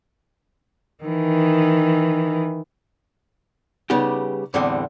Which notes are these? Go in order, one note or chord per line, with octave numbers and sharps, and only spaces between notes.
D#3 E3
C#3 G3 B3 D#4 G4
E2 A2 D3 G3 A3 C4